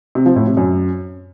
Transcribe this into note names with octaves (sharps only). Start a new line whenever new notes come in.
C3
F3
A2
C3
F#2